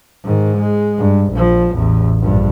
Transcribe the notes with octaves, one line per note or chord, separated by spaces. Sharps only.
G#2 D#3
G#3
G2
A#1 F3
A1 E2
A#1 G2